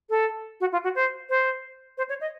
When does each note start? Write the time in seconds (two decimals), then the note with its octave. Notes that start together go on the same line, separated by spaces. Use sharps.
0.09 A4
0.60 F#4
0.72 F4
0.83 F#4
0.95 C5
1.29 C5
1.97 C5
2.09 C#5
2.20 D#5